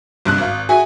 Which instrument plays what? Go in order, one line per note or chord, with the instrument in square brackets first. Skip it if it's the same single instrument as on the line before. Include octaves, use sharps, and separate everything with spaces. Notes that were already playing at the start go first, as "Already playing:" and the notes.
[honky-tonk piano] C2 G2 F#6
G#1 F5
[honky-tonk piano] F#4 G#4 E5 [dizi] G#5